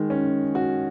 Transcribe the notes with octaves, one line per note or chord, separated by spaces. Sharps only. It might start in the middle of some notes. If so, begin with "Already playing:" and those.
Already playing: D#3 G#3
C#4
F#4